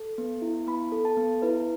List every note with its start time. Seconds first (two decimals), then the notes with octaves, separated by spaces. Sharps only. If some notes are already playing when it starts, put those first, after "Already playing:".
Already playing: A4
0.18 B3
0.42 E4
0.67 B3 B5
0.92 A4
1.05 A5
1.17 B3
1.42 E4 B4